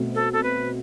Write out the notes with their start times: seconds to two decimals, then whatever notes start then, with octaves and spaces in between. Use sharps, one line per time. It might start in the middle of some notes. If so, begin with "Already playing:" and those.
Already playing: B2 A3 C4
0.15 A4
0.33 A4
0.43 B4